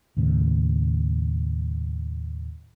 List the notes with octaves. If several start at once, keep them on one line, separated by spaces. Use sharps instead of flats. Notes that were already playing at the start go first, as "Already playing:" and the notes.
D#2 A2 C#3